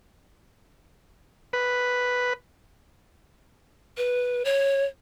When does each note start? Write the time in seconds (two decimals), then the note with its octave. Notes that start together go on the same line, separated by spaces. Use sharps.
1.53 B4
3.97 B4
4.45 C#5